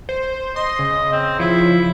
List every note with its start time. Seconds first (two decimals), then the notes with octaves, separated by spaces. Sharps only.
0.09 C5
0.56 D#5 C6
0.79 C#3
1.12 C4
1.40 F3 E4